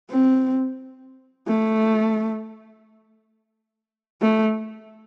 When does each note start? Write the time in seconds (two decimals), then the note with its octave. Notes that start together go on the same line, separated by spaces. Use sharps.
0.10 C4
1.47 A3
4.22 A3